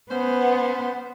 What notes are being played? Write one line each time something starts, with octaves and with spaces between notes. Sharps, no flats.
B3 C#4 B4 C5